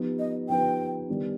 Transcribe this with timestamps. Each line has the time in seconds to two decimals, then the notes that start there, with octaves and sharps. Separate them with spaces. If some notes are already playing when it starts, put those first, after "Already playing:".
Already playing: F3 B3 D#4 G4 B4
0.19 D#5
0.49 F3 B3 D#4 G4 B4 G5
1.08 D#3 G3 B3 D4